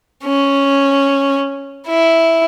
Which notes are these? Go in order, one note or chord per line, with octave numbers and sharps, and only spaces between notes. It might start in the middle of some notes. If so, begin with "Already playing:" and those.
C#4
E4